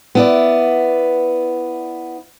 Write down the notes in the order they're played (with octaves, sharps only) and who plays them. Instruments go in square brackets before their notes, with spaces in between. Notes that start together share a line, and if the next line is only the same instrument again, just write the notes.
[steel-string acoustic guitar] B3 E4 D5